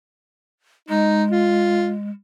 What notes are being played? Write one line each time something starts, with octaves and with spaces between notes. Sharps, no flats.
G#3 D#4
F4